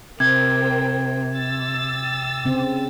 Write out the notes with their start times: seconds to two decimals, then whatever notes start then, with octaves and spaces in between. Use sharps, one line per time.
0.20 C3 A#4 C5 G5 G#6
1.36 E6 A6
2.45 C#3 C4